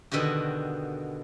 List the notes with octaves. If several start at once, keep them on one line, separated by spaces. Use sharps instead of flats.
B2 D3 D#3 F#4 G4